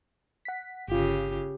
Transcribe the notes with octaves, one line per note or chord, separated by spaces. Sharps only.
F#5 B6
G1 C#3 F4 G4